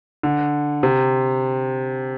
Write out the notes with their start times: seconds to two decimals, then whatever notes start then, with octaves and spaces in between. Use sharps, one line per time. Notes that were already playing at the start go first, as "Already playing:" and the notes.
0.23 D3
0.83 C3